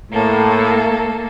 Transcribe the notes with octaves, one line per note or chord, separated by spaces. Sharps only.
A2 A3 A#3 A4